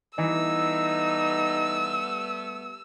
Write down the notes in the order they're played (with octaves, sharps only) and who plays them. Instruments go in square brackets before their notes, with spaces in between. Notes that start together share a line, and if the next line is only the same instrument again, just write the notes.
[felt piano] E3 [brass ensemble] G3 A3 B3 [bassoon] D#4 [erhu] E6